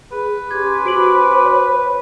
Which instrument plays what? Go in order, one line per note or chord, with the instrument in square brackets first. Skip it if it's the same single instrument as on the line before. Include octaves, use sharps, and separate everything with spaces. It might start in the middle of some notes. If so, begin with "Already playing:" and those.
[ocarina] G#4 [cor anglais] B4
[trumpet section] C#4 C6 D6 [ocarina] G4 [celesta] G#6
[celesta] F#4 D7 F#7 [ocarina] C5
[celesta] C#5